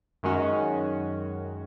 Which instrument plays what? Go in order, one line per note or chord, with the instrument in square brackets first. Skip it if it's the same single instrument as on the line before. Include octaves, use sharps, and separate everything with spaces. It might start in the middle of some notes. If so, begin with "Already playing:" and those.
[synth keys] F#2 D#3 G#3 C#4 F#4